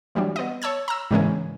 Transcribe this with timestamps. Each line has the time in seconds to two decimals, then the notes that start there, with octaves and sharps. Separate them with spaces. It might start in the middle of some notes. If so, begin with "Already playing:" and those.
0.15 E3 F#3 G3 D4
0.36 B3 D#5
0.62 C#5 A5 E6 G#6
0.88 A#5 E6
1.11 G#2 C#3 E3 G#3 A#3 C#4